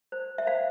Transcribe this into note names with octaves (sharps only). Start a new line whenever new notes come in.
C5
E5
C5 F5